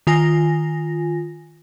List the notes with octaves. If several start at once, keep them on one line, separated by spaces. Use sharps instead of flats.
D#3 F4 G#5 A#6